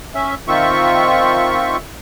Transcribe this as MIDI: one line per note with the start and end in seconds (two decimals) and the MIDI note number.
0.15 0.35 61
0.15 0.35 76
0.48 1.77 51
0.48 1.77 60
0.48 1.77 65
0.48 1.77 76
0.48 1.77 85